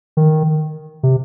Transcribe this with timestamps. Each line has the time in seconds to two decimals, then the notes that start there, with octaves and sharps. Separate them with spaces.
0.17 D#3
1.03 C3